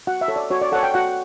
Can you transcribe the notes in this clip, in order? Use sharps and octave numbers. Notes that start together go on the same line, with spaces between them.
F#4 F#5
E5
A4 C#5
D5
F#4 C#5
D5
A4 C#5 F#5
G5
F#4 F#5